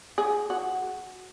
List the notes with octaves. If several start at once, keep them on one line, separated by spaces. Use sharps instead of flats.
G#4
F#4